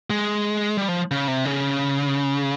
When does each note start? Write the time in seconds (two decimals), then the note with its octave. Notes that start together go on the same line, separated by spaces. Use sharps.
0.10 G#3
0.77 G3
0.88 F3
1.11 C#3
1.28 C3
1.45 C#3